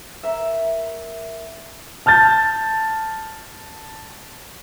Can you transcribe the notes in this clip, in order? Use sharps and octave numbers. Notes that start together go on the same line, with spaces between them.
A#4 E5
A5 F6 G6 A6